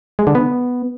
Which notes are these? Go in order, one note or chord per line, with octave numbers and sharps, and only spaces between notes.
G#3
D3
B3